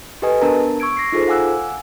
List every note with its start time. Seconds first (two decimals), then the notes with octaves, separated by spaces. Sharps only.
0.22 G4 A4 B4 D#5 G#5 D#6
0.41 B3 D4 A#4 A5 A#5
0.80 C#6 E6 G#6 D7
0.97 D6 A#6 C7
1.12 D#4 F4 G#4 A4 C5
1.28 F5 F#5 G#5 D6 E6 F#6